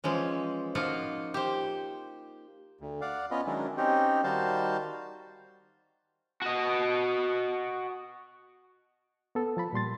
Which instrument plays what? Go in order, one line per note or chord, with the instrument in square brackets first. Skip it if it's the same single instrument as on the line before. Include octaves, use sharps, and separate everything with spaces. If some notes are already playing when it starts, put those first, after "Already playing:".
[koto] E3 F3 G#3 C#4
F3 A#3 D#4 F4 F#4 F#5
G4 C5
[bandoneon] D2
D5 F5 F#5
B3 C#4 F4 B4 D#5
D#3 F#3 G#3 C#4 D4 E4
C4 C#4 D#4 G4
D#3 G3 F#4 C5 F5 A5
[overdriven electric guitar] F#4 D#5
[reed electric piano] B3 A4
F3 A5 B5
A#2 G3 C6 A6